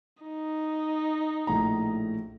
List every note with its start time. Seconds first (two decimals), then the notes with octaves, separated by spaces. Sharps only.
0.23 D#4
1.47 A#1 A2 A#5